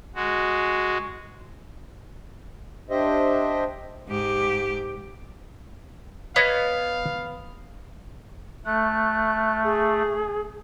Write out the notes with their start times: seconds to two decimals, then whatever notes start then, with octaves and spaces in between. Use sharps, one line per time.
0.15 G#3 F#4
2.90 D4 G4 C5 D#5 E5
4.08 G#2 G4
6.36 B3 C#5 D#5 F5
8.66 A3 F#6
9.64 G#4